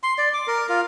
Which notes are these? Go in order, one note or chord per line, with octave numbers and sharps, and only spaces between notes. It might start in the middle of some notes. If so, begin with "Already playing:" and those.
C6
D5
D6
A#4
F4